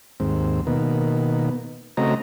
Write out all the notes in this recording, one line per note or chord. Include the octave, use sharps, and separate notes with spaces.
D#2 G#2 C4
B2 D#3 A#3 B3
C#3 A3 C4 F#4 D#5 A#5